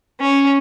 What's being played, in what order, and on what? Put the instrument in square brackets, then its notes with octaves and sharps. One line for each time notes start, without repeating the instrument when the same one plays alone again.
[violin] C#4